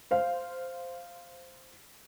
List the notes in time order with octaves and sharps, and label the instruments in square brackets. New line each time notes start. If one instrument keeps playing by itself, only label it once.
[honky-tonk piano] C5 F5